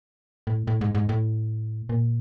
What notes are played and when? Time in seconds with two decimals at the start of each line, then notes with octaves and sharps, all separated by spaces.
0.47 A2
0.67 A2
0.81 G#2
0.95 G#2
1.09 A2
1.89 A#2